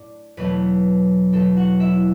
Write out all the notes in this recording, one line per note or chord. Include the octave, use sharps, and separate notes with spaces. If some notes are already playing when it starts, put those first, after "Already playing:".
Already playing: A2 D4 D5
E2 B2 F#3 A3 B4
E2 B2 F#3 A3 A4
F#4 F#5
E4 E5